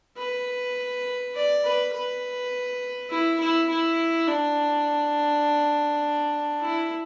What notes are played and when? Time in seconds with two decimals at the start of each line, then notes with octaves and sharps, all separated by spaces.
0.18 B4
1.35 D5
1.64 B4
1.93 B4
3.11 E4
3.40 E4
3.69 E4
4.27 D4
6.61 E4